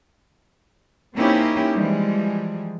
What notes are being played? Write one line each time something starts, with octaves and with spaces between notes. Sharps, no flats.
A#3 C4 C#4 D#4 E4 G4
E3 F3 G3 G#3